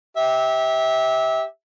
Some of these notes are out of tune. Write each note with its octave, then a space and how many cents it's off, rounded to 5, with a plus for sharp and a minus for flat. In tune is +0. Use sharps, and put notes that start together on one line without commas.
G4 +0 E5 -25